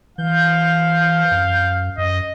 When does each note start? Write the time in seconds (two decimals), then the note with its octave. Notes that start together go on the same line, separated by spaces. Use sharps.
0.18 E3 F5 G6
1.31 F#2
1.98 F#2 D#5